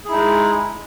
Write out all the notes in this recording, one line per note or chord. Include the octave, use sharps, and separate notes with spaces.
G#3 D#4 E4 G#4